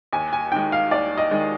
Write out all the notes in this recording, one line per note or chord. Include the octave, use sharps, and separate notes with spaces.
D#2 G#5
G#5
D#3 G#3 G5
F5
D#2 D5
D#5
D#3 G#3